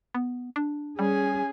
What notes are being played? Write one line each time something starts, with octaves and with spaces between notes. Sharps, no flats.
B3
D4
G3 C#4 G#4 G#5